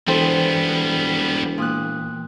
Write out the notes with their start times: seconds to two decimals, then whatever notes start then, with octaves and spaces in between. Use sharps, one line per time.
0.08 E1 E3 G3 B3 A4 C5 G5
1.58 A#2 D#6 F#6